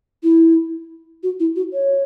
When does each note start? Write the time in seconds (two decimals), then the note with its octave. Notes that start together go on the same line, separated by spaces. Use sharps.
0.23 E4
1.23 F#4
1.40 E4
1.56 F#4
1.73 C#5